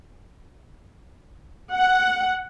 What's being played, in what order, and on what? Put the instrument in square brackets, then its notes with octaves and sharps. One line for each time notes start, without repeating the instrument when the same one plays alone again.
[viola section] F#5